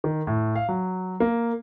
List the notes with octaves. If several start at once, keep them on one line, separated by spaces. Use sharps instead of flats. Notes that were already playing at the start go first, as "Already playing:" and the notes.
D#3
A2
F5
F#3
A#3